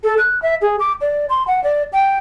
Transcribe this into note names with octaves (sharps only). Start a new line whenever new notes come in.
A4
F#6
E5
G#4
D6
D5
C6
F#5
D5
G5